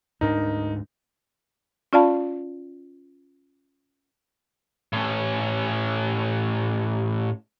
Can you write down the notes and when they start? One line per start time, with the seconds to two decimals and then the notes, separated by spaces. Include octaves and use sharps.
0.21 D2 G#2 D4 D#4 A#4
1.93 C#4 F4 D5 F5 A5 B5
4.93 A2 C#4